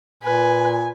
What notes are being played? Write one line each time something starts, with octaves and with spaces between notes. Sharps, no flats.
A#2 B4 G#5